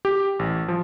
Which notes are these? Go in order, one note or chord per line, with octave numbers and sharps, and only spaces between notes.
G4
A1
F3